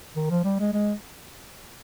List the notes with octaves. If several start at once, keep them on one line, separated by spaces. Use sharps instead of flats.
D#3
F3
G3
G#3
G#3